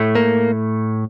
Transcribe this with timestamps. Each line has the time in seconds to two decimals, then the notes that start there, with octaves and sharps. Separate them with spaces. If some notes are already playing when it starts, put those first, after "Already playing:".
Already playing: A2 A3
0.15 A#3